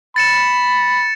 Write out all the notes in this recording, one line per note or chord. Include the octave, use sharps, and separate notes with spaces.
B5 A6 C#7 E7